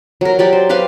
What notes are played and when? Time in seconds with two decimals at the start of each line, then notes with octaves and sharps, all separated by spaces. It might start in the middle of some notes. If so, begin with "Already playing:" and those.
0.21 F#3 A#4
0.39 F#3 G4 D5 B5
0.53 C5
0.69 G4 B4 C5 F5